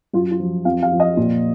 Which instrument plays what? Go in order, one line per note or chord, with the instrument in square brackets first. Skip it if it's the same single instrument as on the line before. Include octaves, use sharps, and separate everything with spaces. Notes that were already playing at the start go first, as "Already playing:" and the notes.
[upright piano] F#2 F4
F4
F3
F2 F5
F5
F3
D#5
A#2